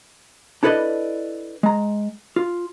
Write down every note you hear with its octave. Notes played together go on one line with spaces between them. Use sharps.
D4 E4 A4 B4 D5 D#5
G#3 A#5
F4